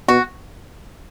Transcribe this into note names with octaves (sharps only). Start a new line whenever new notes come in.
B2 F#4